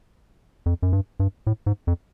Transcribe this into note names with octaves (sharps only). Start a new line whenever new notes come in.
F2
F#2
G2
G2
A2
G#2
F2